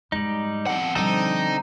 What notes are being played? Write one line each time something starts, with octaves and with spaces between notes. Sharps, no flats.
F2 G#2 G3 G#3 D#4
F2 F#5
B2 D3 F3 G3 C4 D#4 A4